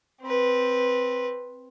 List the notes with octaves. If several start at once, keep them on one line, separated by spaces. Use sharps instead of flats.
C4 B4